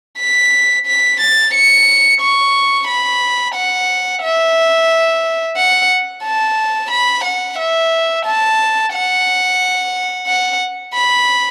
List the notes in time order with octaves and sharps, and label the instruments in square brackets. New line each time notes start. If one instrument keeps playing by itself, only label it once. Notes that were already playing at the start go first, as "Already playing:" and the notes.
[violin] B6
B6
A6
C#7
C#6
B5
F#5
E5
F#5
A5
B5
F#5
E5
A5
F#5
F#5
B5